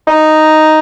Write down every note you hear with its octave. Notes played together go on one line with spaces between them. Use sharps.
D#4